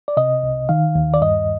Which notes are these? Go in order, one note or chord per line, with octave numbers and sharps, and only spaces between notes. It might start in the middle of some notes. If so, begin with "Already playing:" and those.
D5
C3 D#5
C2
D#3 F5
D#2
D5
G2 D#5